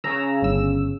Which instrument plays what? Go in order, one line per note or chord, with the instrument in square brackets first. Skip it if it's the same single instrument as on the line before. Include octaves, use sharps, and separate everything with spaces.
[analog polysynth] C#3 [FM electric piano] A#5 E6
[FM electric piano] G1 E6